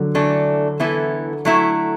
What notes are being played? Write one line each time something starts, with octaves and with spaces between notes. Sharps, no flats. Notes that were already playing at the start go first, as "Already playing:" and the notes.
Already playing: D3 F#3
E3 A3 D4 A4
E3 B3 E4 A4
F#3 A3 E4